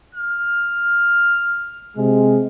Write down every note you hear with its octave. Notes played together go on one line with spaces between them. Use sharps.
F6
C3 G#3